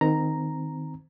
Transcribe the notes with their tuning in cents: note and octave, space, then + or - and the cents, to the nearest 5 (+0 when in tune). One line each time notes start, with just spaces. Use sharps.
D#3 +0 C4 -20 A#5 +0